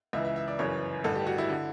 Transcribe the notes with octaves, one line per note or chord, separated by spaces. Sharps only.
C#2 C#3 E3 E5
E5
E5
D5
G1 F#2 C#3 E3 C#5
A1 G2 D3 A4
G4
F#4
E4
D3